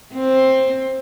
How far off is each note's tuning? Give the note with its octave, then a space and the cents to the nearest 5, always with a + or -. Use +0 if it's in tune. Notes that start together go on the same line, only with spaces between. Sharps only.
C4 +10